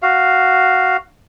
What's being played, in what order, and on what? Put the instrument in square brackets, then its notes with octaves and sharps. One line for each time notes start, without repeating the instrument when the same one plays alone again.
[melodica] F#4 F5